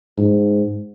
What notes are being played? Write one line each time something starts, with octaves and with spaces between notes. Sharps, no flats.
G#2